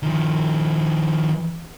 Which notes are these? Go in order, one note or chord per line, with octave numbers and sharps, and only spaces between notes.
D#3 F3